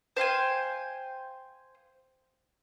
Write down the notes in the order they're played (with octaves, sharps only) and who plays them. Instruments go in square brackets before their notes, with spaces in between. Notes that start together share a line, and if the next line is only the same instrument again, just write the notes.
[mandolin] C5 F5 G5 G#5